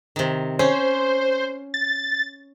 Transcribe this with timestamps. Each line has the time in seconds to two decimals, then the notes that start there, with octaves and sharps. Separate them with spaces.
0.16 C3 D#3
0.59 C#4 C5
1.74 A6